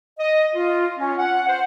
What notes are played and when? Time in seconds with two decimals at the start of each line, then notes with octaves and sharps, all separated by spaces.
0.19 D#5
0.55 F4
0.98 C#4
1.18 F#5
1.48 C5